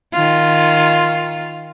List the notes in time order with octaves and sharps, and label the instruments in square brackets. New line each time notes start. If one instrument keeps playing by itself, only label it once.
[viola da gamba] D#3 F4